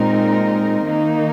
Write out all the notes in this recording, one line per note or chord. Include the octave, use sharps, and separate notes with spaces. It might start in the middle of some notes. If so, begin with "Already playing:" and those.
Already playing: A#2 G#3 C4 D#4 A#4
D#3 A#3 D#4